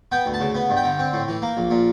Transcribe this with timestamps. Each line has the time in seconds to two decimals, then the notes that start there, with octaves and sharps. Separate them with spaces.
0.12 B3 G5
0.26 D2
0.34 A5
0.40 C#3
0.55 B3
0.70 G2
0.77 G5
0.84 D3
0.99 C4
1.13 A2
1.28 E3
1.42 A#3
1.57 A#1
1.71 A#2